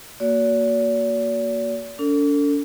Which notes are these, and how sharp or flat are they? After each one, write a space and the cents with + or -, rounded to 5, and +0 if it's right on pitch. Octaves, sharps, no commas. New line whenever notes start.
A#3 +0 F#4 +0 D5 -45
D4 -45 A4 +30